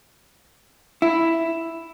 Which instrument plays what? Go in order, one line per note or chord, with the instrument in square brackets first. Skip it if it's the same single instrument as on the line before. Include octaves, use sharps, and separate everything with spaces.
[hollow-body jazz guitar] E4